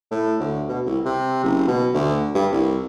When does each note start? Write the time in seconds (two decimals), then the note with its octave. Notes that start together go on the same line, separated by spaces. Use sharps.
0.11 A2
0.40 D2
0.68 B2
0.86 C2
1.05 C3
1.43 F#1
1.68 B2
1.94 D2
2.35 G2
2.52 C2